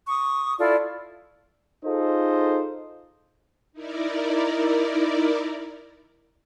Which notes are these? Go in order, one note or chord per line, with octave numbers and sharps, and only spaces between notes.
C#6 D#6
E4 F4 A4 D5
D#4 F4 G#4 A4 C5 D#5
D#4 E4 A#4 D5